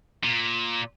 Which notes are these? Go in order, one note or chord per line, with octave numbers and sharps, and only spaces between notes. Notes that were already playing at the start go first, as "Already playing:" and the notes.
A#2